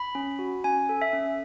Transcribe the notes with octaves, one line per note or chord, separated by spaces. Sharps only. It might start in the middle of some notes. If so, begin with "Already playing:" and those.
Already playing: B5
C#4
F#4
C#4 G#5
A4
E5
C#4